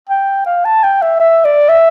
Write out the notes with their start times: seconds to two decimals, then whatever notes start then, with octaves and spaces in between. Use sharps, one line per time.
0.09 G5
0.46 F5
0.65 A5
0.83 G5
1.02 E5
1.20 E5
1.45 D5
1.69 E5